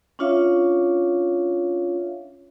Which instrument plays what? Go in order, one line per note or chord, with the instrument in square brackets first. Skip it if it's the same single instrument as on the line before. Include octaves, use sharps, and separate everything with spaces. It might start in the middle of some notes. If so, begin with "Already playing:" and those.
[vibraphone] C#4 D4 F4 C#5 E5 F5